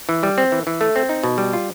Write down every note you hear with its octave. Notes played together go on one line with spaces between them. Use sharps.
E3
G3
C4
E3
E3
A3
C4
D#4
B2
G3
F4